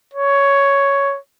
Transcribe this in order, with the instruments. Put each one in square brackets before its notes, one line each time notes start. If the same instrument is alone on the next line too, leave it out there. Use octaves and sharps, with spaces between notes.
[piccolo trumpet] C#5